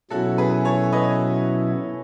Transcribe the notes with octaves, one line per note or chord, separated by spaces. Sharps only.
B2 F#3 C#4 E4 F#4 A4
G#4 B4
A4 C#5
B4 D#5